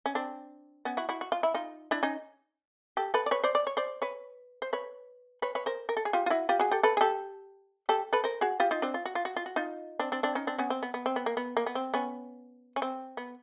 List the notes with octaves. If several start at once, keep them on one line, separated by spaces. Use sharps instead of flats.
C#4
C4 D4
B3 C#4
E4 F#4
E4 F#4
F#4
F4
E4
D#4 F4
D4 E4
C#4 D#4
G4 A4
A4 B4
D5
B4 C#5
C5 D5
D5
C#5
C5 D5
B4 C#5
C5
B4 C#5
B4 C#5
B4 C#5
A#4 C5
A#4
A4
G#4
F4 G4
F4
E4 F#4
F4 G4
F#4 G#4
G4 A4
A4 B4
G#4
G4 A4
G4 A4
A4 B4
A#4 C5
F#4 G#4
F4 G4
D#4 F4
C4 D4
F4
F#4
F4
F#4
F4
F#4
D#4 F4
C4 D4
C4 D4
C4 D4
C#4 D#4
C4 D4
B3 C#4
C4
B3
B3
C4
B3
A#3
B3
A#3
B3
C4
B3 C#4
C#4
C4
B3